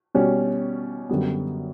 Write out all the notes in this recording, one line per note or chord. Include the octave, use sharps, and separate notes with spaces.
B2 G3 C#4
F#2 D3 G3 B3